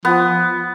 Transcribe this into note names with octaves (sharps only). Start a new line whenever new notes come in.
F3 B3